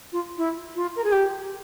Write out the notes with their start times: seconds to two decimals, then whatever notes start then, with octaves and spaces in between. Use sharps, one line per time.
0.12 F4
0.37 E4
0.75 F4
0.96 A#4
1.04 G#4
1.12 G4